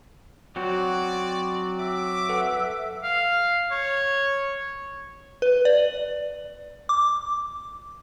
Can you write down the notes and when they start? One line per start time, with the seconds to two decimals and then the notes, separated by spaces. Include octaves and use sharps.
0.56 F#3 C4 F#4 D5
1.79 E5 D6
2.29 A4 B4 F#5
3.03 F5
3.71 C#5
5.42 B4
5.65 D5
6.89 D6